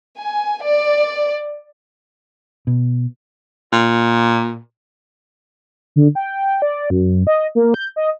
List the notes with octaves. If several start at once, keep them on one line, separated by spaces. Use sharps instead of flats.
G#5
D5
B2
A#2
D3
G5
D5
F#2
D#5
A#3
G6
D#5